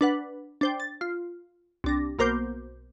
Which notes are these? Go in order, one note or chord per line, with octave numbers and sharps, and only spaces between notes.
D4 B4 F#5
D4 C5 G5
A6
F4
C2 D4 A#6
B1 A#3 A#4 C5 D6 G6